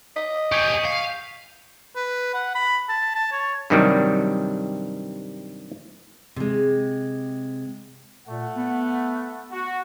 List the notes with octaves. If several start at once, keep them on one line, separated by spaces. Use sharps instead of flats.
D#5 B6
G4 G#4 C#6 G6 C#7
F5
B4
F#5
B5
A5
A5
C#5
G2 C3 D#3 F#3 G3
C3 G#3
A#2 A3 F#5
B3
F#4